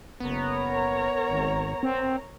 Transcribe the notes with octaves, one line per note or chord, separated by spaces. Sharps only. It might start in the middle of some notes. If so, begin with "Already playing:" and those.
F#1 B3 A#4 C#5 A#5
G#1
C4